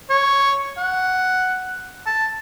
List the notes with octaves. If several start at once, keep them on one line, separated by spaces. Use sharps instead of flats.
C#5
F#5
A5